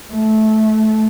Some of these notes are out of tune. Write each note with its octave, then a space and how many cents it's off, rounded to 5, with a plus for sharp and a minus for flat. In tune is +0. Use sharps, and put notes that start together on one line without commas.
A3 -15